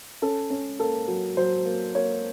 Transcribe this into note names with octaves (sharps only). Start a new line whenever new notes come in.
C#4 A4
C#4
A#3 A4
F#3
F#3 C5
A#3
A#3 C#5